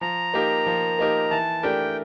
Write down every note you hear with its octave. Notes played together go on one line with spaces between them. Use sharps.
F3 A#5
A#3 D#4 G4 A#4
F3
A#3 D#4 G4 A#4
E3 A5
A3 D4 G4 A#4 G5